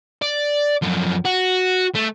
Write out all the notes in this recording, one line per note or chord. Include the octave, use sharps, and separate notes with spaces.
D5
F#2 F3
F#4
A3